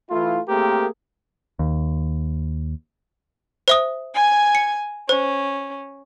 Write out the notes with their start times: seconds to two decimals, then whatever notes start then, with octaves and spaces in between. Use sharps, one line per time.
0.10 E3 A3 E4 F4
0.48 A3 A#3 C4 G4 G#4 A#4
1.59 D#2
3.68 C5 E5 D#6
4.14 G#5 G#6
4.55 C#7
5.09 C#4 C5